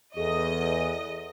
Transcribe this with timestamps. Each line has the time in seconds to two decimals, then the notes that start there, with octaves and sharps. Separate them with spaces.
0.17 E2 G#4 A4 D#5